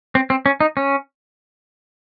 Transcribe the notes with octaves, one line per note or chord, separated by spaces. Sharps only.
C4
C4
C#4
D#4
C#4